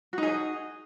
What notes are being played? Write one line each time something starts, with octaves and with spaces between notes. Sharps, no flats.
D#4 F#4 G#4 D#5